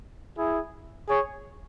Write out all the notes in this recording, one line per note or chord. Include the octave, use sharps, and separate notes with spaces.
E4 G#4
G#4 C#5